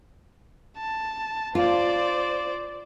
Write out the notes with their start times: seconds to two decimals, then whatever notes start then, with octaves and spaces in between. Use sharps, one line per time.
0.77 A5
1.55 F4 C5 D5